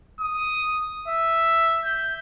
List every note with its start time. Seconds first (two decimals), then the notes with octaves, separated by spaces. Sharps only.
0.21 D#6
1.08 E5
1.86 G6